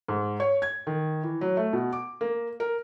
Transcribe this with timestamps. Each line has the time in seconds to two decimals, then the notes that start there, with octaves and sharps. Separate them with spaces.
0.08 G#2
0.40 C#5
0.62 G#6
0.87 D#3
1.23 E3
1.41 F#3
1.57 A3
1.73 B2
1.92 D6
2.21 A#3
2.60 A#4